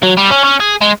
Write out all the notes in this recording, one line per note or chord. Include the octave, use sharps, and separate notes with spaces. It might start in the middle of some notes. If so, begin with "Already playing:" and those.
F#3
G3
C#4
C#4
G#4
G#3